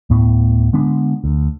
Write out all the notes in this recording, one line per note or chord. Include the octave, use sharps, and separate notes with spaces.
D1 A2 B3
D3 G#3 B3 D4
D2